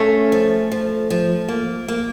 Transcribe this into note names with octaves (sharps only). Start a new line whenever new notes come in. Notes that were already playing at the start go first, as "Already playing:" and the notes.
Already playing: A3 C#4
F3
F3
F3
A#3
A#3